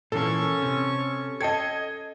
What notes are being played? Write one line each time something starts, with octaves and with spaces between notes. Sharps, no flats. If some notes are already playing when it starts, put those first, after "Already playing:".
A#2 E3 A#3 C#4 A4 C#6
C3
A4 D#5 G5 A5 G#6